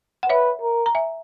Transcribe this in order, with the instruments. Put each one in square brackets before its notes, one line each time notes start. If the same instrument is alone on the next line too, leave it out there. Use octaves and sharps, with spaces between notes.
[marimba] F#5
[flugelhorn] B4 [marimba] C#5 E5
[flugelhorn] A#4
[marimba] A#5
E5 G#5